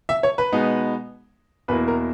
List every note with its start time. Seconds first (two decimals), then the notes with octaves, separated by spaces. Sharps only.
0.09 E5
0.23 C#5
0.38 B4
0.52 B2 G#3 B3 D#4
1.68 E2 B2 A#3 E4 B4
1.88 A#4